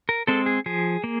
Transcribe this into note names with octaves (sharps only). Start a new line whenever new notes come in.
A#4
G#3 C4 A4
G#4
F3 G#4
A#3